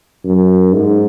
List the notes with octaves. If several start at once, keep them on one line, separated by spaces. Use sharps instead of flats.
F#2
G#2